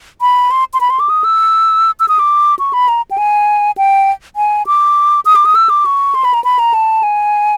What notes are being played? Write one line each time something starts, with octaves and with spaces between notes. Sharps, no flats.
B5
C6
C6
B5
C6
D6
D#6
E6
E6
D#6
D6
C#6
B5
A#5
G5
G#5
G5
G#5
D6
D#6
D6
D#6
E6
D6
C#6
C6
B5
A#5
B5
A#5
A5
G#5